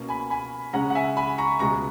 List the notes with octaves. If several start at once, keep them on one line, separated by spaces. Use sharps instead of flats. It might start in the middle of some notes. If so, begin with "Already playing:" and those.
Already playing: B2 A#3 C#4
G#5 B5
G#5 B5
C#3 G#3 C#4 F#5 A#5
F#5
E5 G#5
G#5 B5
A#5 C#6
C#2 B2 G#3 A#5 C#6